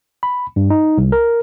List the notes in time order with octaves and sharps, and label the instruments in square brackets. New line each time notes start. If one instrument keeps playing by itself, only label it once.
[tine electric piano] B5
G2
D#4
C2
A#4